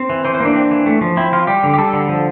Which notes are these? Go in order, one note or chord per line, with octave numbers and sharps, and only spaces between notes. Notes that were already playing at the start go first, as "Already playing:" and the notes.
Already playing: C4
E3
E3 C5
C5
A#3 D4
C4
E3
A3
F3
C4 E4
F3 F4
G3 G4
D3
G4
G3 A4
D3
F3